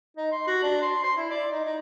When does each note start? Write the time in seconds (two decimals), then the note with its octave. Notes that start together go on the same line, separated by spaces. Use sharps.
0.17 D#4
0.32 C6
0.47 F#4
0.63 D4
0.82 C6
1.04 C6
1.17 E4
1.30 D5
1.51 D#4
1.65 D#4